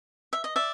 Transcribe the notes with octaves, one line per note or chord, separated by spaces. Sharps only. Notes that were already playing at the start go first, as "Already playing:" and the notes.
E5
D#5
D5 E5